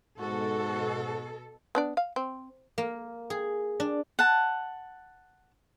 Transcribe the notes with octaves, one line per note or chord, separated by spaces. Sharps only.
G#2 B2 F#4 A4
B3 D4 D5
F5
C4
A#3
G#4
D4
F#5 A5